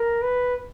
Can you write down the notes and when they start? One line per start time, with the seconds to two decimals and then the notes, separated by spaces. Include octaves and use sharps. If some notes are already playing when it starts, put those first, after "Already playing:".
Already playing: A#4
0.22 B4